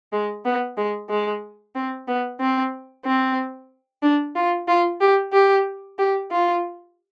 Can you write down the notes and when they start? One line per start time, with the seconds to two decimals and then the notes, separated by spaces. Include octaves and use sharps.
0.13 G#3
0.45 B3
0.77 G#3
1.09 G#3
1.75 C4
2.08 B3
2.40 C4
3.05 C4
4.03 D4
4.36 F4
4.68 F4
5.01 G4
5.33 G4
5.99 G4
6.31 F4